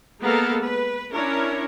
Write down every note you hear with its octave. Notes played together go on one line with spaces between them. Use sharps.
G#3 A#3 B3 A4 A#4 F5
B4
C#4 D4 E4 A#4 C#5